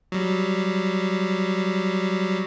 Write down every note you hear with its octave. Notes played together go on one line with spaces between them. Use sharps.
F#3 G3